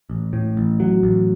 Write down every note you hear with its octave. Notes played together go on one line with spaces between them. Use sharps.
A1
A2
A1
F#3
A1